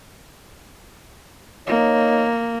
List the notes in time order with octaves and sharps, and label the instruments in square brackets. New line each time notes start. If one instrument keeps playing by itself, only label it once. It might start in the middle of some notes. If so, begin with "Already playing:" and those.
[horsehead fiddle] A#3 [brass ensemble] D#4 C#5